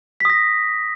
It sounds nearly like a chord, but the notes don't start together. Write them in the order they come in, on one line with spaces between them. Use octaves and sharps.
B6 D#6 A#6